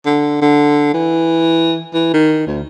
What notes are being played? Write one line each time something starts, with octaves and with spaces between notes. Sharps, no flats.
D3
D3
E3
E3
D#3
D2